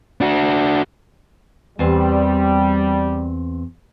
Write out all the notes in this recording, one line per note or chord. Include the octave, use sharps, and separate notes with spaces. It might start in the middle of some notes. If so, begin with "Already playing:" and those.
D4 F#4
E2 G3 C4